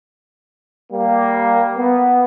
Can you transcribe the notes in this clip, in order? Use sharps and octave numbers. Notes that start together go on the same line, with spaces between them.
G3 A#3
B3